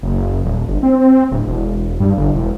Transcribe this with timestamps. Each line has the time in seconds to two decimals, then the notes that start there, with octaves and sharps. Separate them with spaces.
0.03 F#1
0.44 D#1
0.68 G1
0.83 C4
1.32 D1
1.47 E1
2.00 G2
2.17 G1
2.35 E1